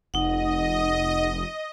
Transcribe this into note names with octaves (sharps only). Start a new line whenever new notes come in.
F1 D#4 D#5 F#5